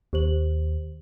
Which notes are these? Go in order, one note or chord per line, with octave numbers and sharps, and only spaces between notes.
D#2 G4 C5 F#7